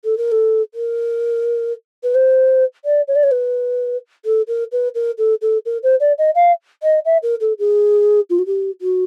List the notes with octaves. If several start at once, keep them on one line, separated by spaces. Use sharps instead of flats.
A4
A#4
A4
A#4
B4
C5
D5
C#5
D5
C#5
B4
A4
A#4
B4
A#4
A4
A4
A#4
C5
D5
D#5
F5
D#5
E5
A#4
A4
G#4
F4
F#4
G4
F#4